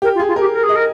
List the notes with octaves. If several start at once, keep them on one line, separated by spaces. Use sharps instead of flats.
G4 A#4
F4
G#4
F4
G4 A#4
A#4
G#4
D#5
A#4